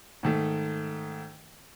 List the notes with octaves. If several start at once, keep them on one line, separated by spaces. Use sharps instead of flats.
G#2 D#3 A3